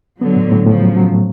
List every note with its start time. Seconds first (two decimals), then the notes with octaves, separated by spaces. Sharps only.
0.20 D3 F#3 B3
0.36 A2
0.52 A2
0.66 A2 C#3 F3
0.82 F#3
0.96 F#3
1.12 A2